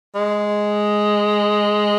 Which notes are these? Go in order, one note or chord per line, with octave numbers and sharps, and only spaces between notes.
G#3